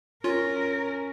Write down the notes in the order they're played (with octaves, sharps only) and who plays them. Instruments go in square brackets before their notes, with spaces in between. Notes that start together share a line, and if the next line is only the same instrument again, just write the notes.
[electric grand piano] C#4 [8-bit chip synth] F4 [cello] A#4